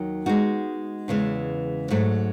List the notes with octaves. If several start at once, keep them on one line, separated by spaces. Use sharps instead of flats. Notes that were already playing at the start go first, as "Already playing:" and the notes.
Already playing: D#2 D#3 F#3
G#3 B3 D#4 F#4
E2 C#3 E3 G#3
G#2 F#3 A3